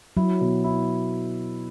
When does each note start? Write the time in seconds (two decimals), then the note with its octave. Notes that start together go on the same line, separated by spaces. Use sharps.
0.17 F#3 E4
0.41 B2
0.64 E4